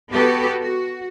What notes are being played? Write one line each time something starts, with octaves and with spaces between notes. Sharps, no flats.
B3 F#4 G4 A4 B4
F#4